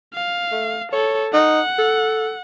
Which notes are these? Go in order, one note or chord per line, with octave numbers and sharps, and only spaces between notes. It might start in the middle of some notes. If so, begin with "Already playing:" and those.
F5
A3
A4 C#5
D#4 F#5
A4